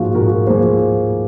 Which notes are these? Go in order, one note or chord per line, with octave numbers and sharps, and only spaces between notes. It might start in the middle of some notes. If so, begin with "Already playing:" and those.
Already playing: G#2 F3 A#3 F4 F#4 G#4
G#2 F#4 A#4
F3 A#3 G#4 C5